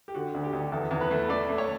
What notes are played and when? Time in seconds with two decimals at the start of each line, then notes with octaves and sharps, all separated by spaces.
0.08 G4
0.15 D3 F#4
0.34 D2
0.44 G4
0.53 D2
0.72 E2 A4
0.91 E2
1.01 B4
1.11 A3
1.29 A3 D5
1.49 A3
1.58 C#5